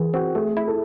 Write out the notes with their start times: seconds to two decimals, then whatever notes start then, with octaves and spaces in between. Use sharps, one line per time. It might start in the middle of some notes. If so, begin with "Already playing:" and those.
Already playing: E3 G#4 A#4 B4
0.14 C4 F#4
0.35 A3 G#4
0.57 E4
0.68 A4